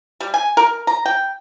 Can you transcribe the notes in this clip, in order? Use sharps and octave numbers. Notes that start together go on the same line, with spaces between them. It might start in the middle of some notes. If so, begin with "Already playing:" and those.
G3
G#5
A#4
A#5
G5